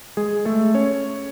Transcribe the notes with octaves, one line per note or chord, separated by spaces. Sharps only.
G#3 G#4
A3 A4
C#4 C#5